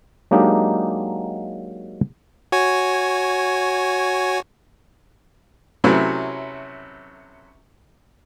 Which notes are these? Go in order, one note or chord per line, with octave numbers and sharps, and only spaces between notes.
F#3 G#3 A#3 D4 D#4 G4
F#4 C#5 G#5
C3 F#3 A3 C#4 E4 B4